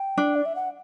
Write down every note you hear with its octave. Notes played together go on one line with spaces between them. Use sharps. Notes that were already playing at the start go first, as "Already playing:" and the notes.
Already playing: G5
D4
D5
E5
F#5